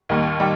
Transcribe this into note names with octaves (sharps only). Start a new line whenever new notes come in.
D#2 D#3 G3
D#3 G3